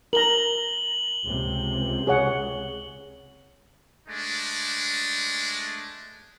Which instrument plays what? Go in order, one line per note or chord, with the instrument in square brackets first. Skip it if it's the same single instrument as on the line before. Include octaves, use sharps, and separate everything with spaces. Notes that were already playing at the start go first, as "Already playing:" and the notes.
[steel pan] A#4 A#5 [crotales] F#7 G7
[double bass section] C#2 C3
[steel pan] G#4 C#5 F#5
[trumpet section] G#3 A3 D4